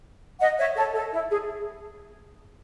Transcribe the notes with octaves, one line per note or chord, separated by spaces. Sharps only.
D#5 F#5
C#5 E5
A4 C#5
A4
E4
G#4